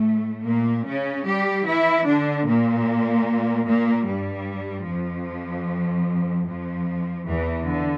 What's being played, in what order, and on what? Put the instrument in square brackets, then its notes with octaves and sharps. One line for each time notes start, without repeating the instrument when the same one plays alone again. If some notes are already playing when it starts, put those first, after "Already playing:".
Already playing: [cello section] A2 A3
A#2 A#3
C#3 C#4
G3 G4
E3 E4
D3 D4
A#2 A#3
A#2 A#3
G2 G3
F2 F3
F2 F3
E2 E3
D3